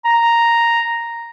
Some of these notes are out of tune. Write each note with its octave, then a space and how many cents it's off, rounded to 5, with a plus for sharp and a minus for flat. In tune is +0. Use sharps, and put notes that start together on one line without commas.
A#5 +0